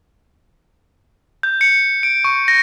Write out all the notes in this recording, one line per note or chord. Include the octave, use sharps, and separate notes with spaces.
G6
C#7
D7
C#6
A#6